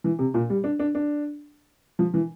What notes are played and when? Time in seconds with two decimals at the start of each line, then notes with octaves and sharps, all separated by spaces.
0.04 E3
0.19 C3
0.34 A#2
0.50 G3
0.64 D4
0.79 D4
0.95 D4
1.99 F3
2.14 E3